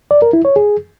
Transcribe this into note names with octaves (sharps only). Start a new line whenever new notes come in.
D5
A#4
E4
C#5
G#4